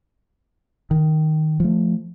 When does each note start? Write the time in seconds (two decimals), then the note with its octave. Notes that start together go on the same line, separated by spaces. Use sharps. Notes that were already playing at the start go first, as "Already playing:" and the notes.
0.91 D#3
1.60 F3 A3